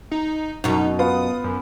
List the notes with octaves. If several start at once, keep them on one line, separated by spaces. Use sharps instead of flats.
D#4
F#2 B2 D#4
B3 F4 D#6
F#2